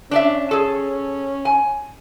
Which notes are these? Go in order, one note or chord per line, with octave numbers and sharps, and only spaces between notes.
C#4 D4 D5 E5
G#4 A4
G#5